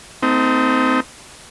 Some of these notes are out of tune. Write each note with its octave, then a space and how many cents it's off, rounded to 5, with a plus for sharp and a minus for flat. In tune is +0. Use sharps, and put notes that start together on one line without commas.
A3 +25 C4 -20 D#4 +25